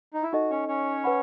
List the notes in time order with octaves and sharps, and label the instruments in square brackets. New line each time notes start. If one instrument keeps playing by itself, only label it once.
[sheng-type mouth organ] D#4
E4
[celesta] D#4 A4 D#5 [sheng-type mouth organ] F#4
[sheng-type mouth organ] C#4 C#5
C#4 C#5
[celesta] B4 F#5 B5